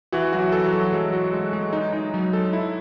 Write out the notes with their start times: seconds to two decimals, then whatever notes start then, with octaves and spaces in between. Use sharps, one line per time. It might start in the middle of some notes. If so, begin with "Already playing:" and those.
0.12 E3 F#4
0.32 F#3 F#4
0.39 E3
0.52 A4
0.66 F#3
0.73 A4
0.93 F#3 G#3
1.13 F#4
1.33 G#3
1.53 G#3
1.73 D#4
1.93 D#4
2.14 F#3
2.33 A4
2.53 E4